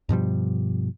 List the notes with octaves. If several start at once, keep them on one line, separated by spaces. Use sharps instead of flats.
G2 B2 F3 G3